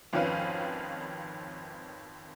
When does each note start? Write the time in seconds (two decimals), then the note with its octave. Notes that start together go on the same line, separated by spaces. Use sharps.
0.13 G#1 F2 D#3 C#4 B4 F5